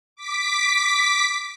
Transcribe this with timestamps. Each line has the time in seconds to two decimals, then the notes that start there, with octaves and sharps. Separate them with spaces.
0.16 D6 B6